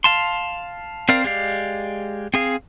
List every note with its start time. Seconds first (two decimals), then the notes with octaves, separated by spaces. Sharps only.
0.04 F5 A5 C6
1.09 C4 A#4 D5 F5
1.24 G#3 G4 D5 F5
2.34 C4 G#4 F5